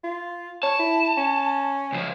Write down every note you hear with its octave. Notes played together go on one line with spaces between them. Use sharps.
F4
C#5 A5
E4
C#4
C#2 F3